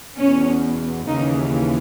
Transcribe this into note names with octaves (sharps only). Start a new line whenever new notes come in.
E2 B2 C#4
D#2 C#3 E3 D#4